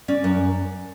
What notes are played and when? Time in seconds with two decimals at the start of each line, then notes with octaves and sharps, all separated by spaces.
0.08 C#4 D5
0.24 F#2